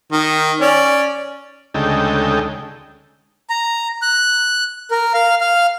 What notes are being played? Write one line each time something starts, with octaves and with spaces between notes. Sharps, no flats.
D#3
C#4 D5
D2 C#3 G#3 D#4 A4 G5
A#5
F#6
A#4
F5
F5